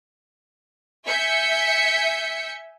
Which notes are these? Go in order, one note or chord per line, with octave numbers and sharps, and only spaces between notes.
E5 G#5 G6 B6 C#7